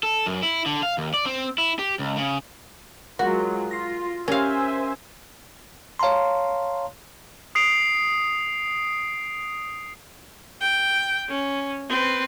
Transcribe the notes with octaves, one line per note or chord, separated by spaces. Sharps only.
A4
F#2
E4
D3
F5
D#2
D5
C4
E4
G4
C#2
C#3
F#3 G#3 F4 F#4 A#4
F4 A#6 C7
C#4 G4 A#4 C5 E5 F5 G#5
C#5 F5 A5 A#5 C6
D#6 C7 D7 F7
G5
C#4
C4 B4